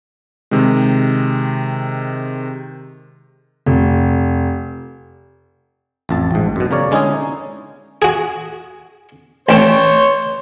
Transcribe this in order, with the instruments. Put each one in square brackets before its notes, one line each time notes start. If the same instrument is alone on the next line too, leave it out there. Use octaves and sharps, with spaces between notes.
[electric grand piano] C3 D#3 G#3
[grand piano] F1
[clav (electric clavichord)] A1 F2 A5
A1 G#2
F#2 B2
C#3 A#4 C#5 D5
D3 G#3 C#4 D#4 E4 G#4
[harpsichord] F#4 G#4
[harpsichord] A1 C4 A5 [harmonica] C#5 C6